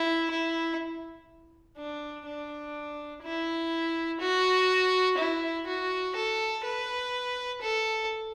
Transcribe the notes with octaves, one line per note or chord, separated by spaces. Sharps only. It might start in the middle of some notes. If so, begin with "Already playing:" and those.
Already playing: E4
E4
D4
D4
E4
F#4
E4
F#4
A4
B4
A4